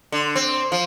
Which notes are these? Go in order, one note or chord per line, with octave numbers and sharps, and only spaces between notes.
D3
C4
F3